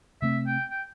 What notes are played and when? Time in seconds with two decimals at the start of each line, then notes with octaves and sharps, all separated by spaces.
0.22 C3 A3 C4 E5
0.47 G5
0.71 G5